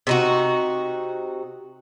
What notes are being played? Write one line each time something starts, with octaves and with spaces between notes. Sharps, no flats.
C3 D#4 F#4